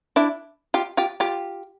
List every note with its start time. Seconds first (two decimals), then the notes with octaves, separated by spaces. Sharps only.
0.16 D4 E4
0.74 F4 G4
0.97 F4 G4
1.20 F4 G4